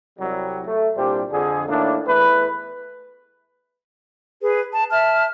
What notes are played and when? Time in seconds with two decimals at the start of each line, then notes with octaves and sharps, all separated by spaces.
0.19 C2 F#3 G3
0.66 A3
0.97 C2 A#2 G3 D4 G4 C5
1.32 F2 D3 G#4
1.68 A2 D#3 A#3 D4
2.06 E2 E3 A3 B4
4.42 G#4 B4
4.71 A5
4.91 E5 A5 F6